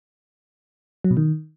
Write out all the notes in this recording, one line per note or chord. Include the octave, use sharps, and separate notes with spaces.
F#3
B2
D#3